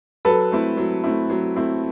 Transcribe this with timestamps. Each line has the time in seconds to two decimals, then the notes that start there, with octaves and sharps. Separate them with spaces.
0.25 F#3 A4 B4
0.51 A3 C4 E4
0.77 F#3
1.04 A3 C4 E4
1.30 F#3
1.56 A3 C4 E4